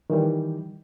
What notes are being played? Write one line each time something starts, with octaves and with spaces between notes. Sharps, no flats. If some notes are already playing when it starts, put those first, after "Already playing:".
D#3 E3 G3